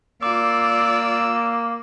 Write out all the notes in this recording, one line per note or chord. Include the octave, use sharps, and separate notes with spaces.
A#3 F4 D5 D6 E6